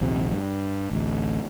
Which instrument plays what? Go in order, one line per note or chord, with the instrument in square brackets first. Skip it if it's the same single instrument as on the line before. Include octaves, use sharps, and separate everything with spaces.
[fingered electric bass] A#1 D#2 C3
G2
A1 D2